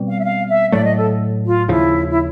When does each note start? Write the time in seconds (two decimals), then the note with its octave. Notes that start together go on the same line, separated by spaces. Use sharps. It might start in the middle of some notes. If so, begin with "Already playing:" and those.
Already playing: B2 G3 C4
0.08 F5
0.19 E5
0.24 F5
0.48 E5
0.72 A2 F#3 A3 D5
0.84 D#5
0.96 A4
1.45 F4
1.68 D#2 C#3 F3 E4
2.09 E4